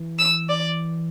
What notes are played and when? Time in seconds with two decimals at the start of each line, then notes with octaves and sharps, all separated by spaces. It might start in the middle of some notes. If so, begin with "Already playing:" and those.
Already playing: E3
0.19 E6
0.49 D5